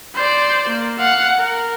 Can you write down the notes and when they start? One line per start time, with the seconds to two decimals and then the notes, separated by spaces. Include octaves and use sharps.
0.15 C5 D5
0.68 A#3
0.98 F5 F#5
1.37 A#4